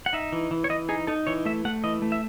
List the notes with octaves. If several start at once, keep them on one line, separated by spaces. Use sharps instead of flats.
F#5
D#4 E5
E3
E3
C#5
E3 D#5
D#4 G#4
D#4 A4
E3 C#5
A3 E5
A3 F#5
E3 D#5
A3
E5